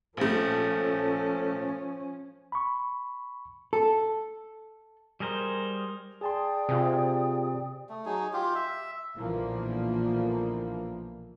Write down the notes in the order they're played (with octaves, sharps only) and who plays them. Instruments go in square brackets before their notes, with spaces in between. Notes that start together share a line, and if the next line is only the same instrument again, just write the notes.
[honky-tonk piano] A#1 A3 [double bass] F3 C#4 [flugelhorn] A4
[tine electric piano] B5 C#6
[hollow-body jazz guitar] A4
[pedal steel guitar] G3 G#4 A#4 C5
[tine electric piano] G#4 A5 C6 [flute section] D5 G5 D#6
[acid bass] C3 [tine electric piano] F4 G#4
[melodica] A3
F#3 D#4 G#4
F4 G4
E5
[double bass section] B1 A#2 D3 E3 F3 A#3